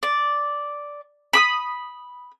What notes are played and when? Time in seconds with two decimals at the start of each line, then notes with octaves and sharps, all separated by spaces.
0.03 D5
1.33 B5 D6 D#6